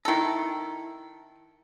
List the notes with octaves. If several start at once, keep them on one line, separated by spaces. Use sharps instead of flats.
D#3 E4 A4 A#5